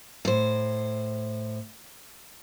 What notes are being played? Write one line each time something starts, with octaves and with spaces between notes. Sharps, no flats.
A2 C5